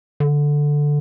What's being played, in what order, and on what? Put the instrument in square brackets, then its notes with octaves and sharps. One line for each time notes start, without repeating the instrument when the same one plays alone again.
[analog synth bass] D3